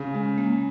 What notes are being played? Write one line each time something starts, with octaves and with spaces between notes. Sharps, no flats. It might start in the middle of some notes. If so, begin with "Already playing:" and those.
Already playing: C#3 C#4
G#3
A#3